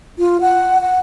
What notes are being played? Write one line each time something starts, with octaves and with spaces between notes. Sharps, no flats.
F4
F#5
F#5